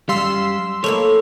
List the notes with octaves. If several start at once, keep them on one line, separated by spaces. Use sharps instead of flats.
F#2 G3 F5 C6 E6
A3 A#3 E4 C#5